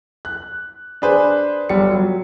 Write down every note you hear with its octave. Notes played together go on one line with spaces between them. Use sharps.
F#6
D4 G#4 B4 C5
G1 G3 C#7
F#3